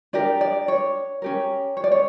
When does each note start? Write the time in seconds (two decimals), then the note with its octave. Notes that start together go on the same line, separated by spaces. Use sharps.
0.13 D4 G4 A#4 D5
0.41 D5
0.68 C#5
1.22 C#4 G4 A#4
1.77 C#5
1.84 D5
1.92 C#5